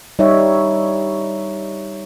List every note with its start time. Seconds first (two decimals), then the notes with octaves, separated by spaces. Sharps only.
0.19 G3 D#4 C#5 E5